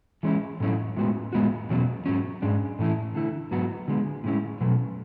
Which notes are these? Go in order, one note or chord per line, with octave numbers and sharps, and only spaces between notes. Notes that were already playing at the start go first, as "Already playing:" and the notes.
E3 G#3 C#4 E4
A2 F#3 C#4 E4
A2 G#3 B3 F#4
A2 G#3 B3 F#4
E2 B2 F#3 C#4
G#2 F#3 C#4
G#2 G#3 D4
A2 E3 A3 E4
D3 A3 E4
G#2 F#3 B3 F#4
D3 G#3 B3
A2 G#3 C#4 E4
B2 F#3 A3